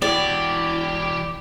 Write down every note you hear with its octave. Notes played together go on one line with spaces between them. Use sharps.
E3 E4 F#4 G4 D5